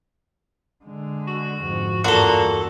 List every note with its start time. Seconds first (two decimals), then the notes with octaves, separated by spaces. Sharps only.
0.84 D3 G#3
1.28 F#4
1.62 F2 G#2
2.04 E2 G2 A#2 F#4 A4